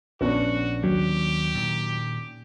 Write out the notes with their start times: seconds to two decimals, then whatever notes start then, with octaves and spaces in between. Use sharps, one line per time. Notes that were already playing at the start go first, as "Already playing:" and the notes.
0.21 A#1 D3 B3 C#4 D4 F#4
0.84 D#2 F#3 G4
1.55 A#2 D#3